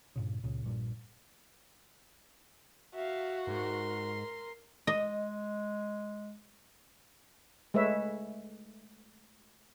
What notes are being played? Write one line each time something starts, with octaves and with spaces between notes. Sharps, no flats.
G2 A#2 C#3
C#2 A#2 C#3
A#1 G2 A#2
F#4 E5 F5
G#2 A#4 C6
G#3 D#5
G#3 A3 B4 C#5 E5